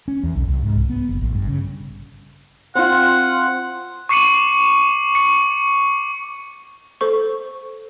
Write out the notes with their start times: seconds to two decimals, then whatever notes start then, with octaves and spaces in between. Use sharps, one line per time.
0.08 C#4
0.23 E2
0.36 B1
0.48 C2
0.63 G#2
0.76 C2
0.90 B3
1.09 F#1
1.22 A1
1.35 G2
1.48 C#3
2.75 C4 F4 F#5
4.09 C#6 D6 C7 C#7 D#7 F#7
5.15 C#6 C#7
7.01 A4 C5 C#6